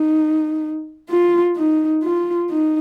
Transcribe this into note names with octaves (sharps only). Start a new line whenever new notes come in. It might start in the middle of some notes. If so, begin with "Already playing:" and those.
Already playing: D#4
F4
D#4
F4
D#4